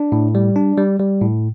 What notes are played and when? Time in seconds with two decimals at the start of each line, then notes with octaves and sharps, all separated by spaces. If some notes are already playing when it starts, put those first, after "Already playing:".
Already playing: D4
0.12 A2
0.35 G3
0.56 D4
0.78 G3
0.99 G3
1.22 A2